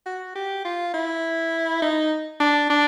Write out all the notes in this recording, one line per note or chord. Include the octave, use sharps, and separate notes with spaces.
F#4
G4
F4
E4
D#4
D4
D4